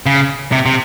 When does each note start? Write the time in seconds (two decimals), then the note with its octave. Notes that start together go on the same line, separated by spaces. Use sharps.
0.06 C#3
0.52 C3
0.66 C3